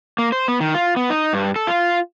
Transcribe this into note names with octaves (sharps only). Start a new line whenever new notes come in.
A#3
C5
B3
D#3
F4
B3
D#4
G2
A4
F4